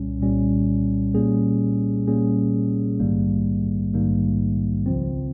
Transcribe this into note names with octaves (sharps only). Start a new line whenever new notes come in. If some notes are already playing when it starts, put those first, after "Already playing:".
Already playing: C2 A#2 G3 C#4
C2 A#2 G3 C#4
A#2 G3 A#3 C#4 G#4
A#2 G3 A#3 C#4 G#4
A#1 G#2 D#3 G3 A#3
A#1 G#2 D#3 G3 A#3
C#2 C#3 F3 C4